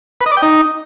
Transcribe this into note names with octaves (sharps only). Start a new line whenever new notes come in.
B4
D#5
D5
G5
D#4